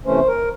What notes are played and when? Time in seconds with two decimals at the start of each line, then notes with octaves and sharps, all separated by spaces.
0.05 C3 E3 A3 C#4 C5
0.27 A#4